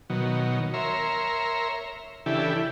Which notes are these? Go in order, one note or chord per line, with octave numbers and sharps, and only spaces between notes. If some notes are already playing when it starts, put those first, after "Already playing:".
B2 D#3 F#3
A#4 C#5 E5 A#5 C6
C#3 E3 D4 E4 G4 A4